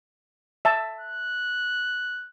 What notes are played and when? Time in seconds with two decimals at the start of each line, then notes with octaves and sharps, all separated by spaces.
0.65 E5 A5
1.01 F#6